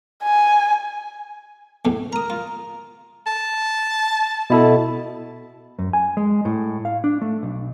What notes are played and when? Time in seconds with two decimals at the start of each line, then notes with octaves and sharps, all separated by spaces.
0.23 G#5
1.85 B1 E2 A2
2.13 A#4 A#5 D#6
2.30 F4
3.27 A5
4.50 B2 E4 A4
5.79 F#2
5.93 G#5
6.17 G#3
6.45 A2
6.85 F5
7.04 D4
7.21 A3
7.43 B1